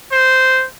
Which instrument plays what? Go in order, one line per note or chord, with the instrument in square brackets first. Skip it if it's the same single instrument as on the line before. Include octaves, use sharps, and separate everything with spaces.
[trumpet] C5